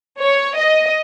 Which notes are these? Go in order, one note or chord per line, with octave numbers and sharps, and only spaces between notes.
C#5
D#5